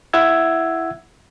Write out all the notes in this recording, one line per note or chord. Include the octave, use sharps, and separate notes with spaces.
E4 E5 F#5 E6 G#6